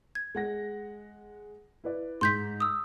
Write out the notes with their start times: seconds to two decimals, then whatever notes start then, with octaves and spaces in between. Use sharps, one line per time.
0.15 G#6
0.35 G#3 F#5 A#6
1.84 E4 B4 D5
2.21 G#2 C6 G6 B6
2.60 D#6 E6